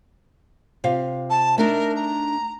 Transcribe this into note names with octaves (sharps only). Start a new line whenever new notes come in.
C3 F4 F5
A5
A3 D4 D#4 A#4
A#5